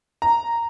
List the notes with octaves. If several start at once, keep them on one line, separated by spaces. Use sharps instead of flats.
A#5